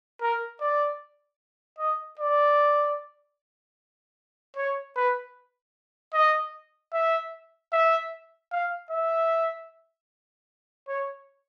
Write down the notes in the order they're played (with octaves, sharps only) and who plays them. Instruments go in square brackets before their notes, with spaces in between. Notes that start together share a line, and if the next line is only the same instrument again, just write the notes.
[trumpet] A#4
D5
D#5
D5
C#5
B4
D#5
E5
E5
F5
E5
C#5